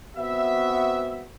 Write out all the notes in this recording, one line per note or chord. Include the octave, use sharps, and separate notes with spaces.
B3 C4 F#4 E5